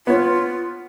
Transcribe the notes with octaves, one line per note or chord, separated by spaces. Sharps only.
B3 F4 C#5